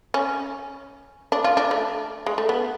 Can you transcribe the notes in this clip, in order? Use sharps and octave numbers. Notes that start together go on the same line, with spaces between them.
C#4
D4
F4
D4
A3
G#3
A3
B3